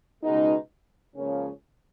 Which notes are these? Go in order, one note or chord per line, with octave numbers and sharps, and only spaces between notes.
C#2 B2 G#3 B3 D#4
C#2 C#3 F3 A#3 C#4